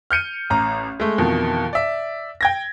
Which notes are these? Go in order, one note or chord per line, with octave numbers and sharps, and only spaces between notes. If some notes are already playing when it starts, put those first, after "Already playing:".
F6 G6 C#7 D#7
A1 A#5
G#3 A3
F2 B2 D#3 E3
D5 E5
G5 G#6 A#6